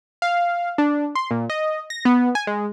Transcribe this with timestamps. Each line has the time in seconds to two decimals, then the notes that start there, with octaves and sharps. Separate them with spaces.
0.22 F5
0.78 D4
1.15 C6
1.31 A#2
1.50 D#5
1.90 A#6
2.05 B3
2.35 G#5
2.47 G#3